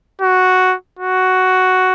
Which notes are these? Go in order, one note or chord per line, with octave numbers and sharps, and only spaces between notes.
F#4
F#4